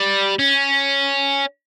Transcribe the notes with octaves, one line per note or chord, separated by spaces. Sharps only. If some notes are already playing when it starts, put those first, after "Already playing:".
Already playing: G3
C#4